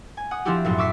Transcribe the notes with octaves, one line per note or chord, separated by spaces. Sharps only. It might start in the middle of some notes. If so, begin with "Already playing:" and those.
G#5
F#5 D#6
F3 C4 D4 E4 F#4 G4
B1 F#2 A2
C#6 D6 E6 B6 C7